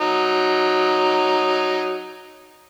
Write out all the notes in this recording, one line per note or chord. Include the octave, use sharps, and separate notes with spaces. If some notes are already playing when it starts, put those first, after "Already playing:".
F#3 D#4